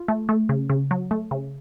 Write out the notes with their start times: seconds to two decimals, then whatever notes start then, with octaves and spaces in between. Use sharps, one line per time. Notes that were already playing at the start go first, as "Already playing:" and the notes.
Already playing: F4
0.08 A3
0.29 A3
0.49 C#3
0.70 C#3
0.91 F#3
1.11 A3
1.31 C#3